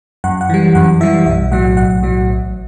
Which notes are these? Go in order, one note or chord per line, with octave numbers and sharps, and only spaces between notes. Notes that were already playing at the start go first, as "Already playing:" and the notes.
F#2 F#5
F#5
E3 G3
F#2 F#5
E3 G3 E5
B1 E5
A2 F#3 F#5
B1 F#5
A2 F#3
A1